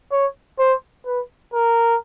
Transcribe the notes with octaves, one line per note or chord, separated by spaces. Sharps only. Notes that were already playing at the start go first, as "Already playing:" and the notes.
C#5
C5
B4
A#4